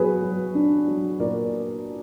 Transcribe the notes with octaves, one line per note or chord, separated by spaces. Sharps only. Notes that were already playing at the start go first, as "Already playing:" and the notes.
Already playing: F#3 B3 F#4 G#4 B4
F#3
D4
F#3
A#2 A#4 D5